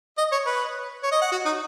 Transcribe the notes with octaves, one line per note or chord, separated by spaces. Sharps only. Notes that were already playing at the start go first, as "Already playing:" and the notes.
D#5
C#5
B4
C#5
D#5
F#5
F#4
D#4